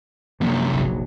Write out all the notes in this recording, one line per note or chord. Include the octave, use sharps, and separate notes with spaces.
F#2 C3 F3 A#3 D4
F1 A#1 F#3